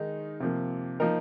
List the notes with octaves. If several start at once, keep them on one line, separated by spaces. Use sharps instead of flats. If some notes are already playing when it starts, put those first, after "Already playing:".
Already playing: D#3 G#3 D#4
C3 F3 A#3
F3 A#3 D#4 A#4